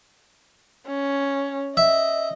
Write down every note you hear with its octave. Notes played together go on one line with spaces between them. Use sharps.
C#4
D#5 E5